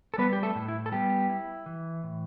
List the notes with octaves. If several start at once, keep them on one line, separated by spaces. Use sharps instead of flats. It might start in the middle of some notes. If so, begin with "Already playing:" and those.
A4
G3 B3 B4
G4
A3 A4
A2
E4
A4
G3 B3 G4
E4
E3
A2